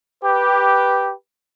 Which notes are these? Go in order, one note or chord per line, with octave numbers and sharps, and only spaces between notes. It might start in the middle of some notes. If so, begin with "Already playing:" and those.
G4 B4